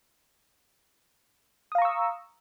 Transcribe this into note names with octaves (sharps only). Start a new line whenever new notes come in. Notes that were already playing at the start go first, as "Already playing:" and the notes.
F5 A#5 C#6 D#6 E6